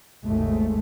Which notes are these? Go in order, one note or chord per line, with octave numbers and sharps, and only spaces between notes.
G#1 D#2 G#2 C#3 G#3 A3